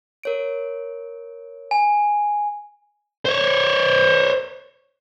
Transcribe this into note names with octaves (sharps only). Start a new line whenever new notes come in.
A#4 C#5 D7
G#5
C5 C#5